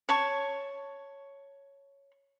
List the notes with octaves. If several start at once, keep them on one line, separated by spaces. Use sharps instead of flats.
C#5 A5 C#6